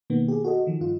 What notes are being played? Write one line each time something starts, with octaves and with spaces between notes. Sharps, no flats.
B2 D#3 A#3 B3
G4 G#4
F#4 A4 D#5
D#3 F3
G2 F4